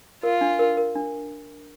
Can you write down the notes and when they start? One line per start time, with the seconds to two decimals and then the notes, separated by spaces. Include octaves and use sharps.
0.23 F4 A#4
0.41 D4
0.59 A#4
0.77 A#4
0.95 D4